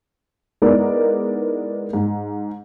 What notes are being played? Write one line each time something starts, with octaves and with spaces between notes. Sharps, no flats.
G#3 B3 D#4 E4 A#4 D5
G#2